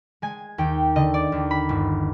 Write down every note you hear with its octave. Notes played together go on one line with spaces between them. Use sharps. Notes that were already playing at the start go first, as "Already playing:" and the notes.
G#3 G#5
D#2 G5
D3 D#5
D5
D#2
B5
G1